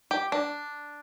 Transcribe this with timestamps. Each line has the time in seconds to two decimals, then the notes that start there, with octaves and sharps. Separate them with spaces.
0.11 G4
0.32 D4